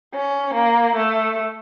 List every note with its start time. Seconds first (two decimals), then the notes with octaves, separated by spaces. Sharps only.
0.14 C#4
0.54 A#3
0.96 A3